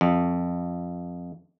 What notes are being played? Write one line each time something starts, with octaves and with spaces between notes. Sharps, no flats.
F2